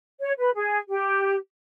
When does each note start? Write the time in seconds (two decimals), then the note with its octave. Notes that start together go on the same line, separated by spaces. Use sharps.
0.21 C#5
0.38 B4
0.55 G#4
0.89 G4